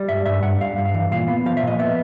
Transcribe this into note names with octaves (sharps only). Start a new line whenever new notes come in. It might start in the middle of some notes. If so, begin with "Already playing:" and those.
Already playing: G3
G2 E5
G2 E5
G2 F#5
G2 F5
G2
F5
E3
A#2 F5
B3
F3 F5
E5
A#2 D#5
B3 E5